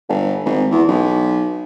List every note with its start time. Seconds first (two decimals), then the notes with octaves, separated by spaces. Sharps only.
0.09 G1
0.45 G#1
0.71 E2
0.88 B1